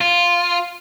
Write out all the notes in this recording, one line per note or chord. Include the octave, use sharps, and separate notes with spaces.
F4